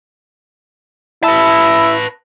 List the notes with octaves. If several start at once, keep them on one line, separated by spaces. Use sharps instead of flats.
E4 B4 A5